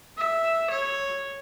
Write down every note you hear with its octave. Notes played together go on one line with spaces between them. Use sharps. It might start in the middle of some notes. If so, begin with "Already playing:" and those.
E5
C#5